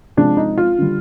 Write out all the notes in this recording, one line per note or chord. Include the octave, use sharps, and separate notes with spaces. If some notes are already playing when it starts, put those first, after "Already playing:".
C3 F3 G#3 D4
D#4
F4
D3 G3